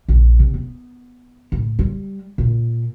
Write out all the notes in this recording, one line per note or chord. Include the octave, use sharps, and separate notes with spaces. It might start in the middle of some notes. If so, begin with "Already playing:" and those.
A#1
C3
B3
A2
G3
A#2